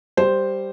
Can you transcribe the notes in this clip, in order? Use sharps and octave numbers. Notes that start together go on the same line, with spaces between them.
G3 C5